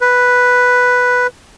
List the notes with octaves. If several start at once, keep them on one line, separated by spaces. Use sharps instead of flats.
B4